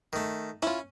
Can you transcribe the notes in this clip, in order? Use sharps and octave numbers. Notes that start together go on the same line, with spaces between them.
D#3 A3
C#4 E4 F4